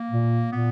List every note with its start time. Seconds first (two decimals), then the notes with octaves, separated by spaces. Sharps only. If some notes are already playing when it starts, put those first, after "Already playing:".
Already playing: A#3
0.11 A#2
0.52 A#2 B3